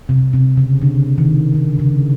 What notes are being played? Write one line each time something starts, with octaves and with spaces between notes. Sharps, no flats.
C3
C3
C#3
D3
D#3
D3
C#3